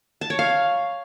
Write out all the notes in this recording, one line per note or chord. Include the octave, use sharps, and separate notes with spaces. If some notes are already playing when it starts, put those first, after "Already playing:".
A5
C#5
F5